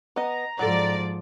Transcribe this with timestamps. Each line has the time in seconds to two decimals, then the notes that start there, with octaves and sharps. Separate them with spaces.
0.16 B3 D#5 A#5
0.59 G#2 F3 F#3 A4 D5